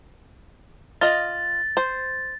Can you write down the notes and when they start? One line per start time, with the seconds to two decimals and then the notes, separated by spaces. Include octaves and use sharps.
1.01 F4 D#5 A6
1.77 C5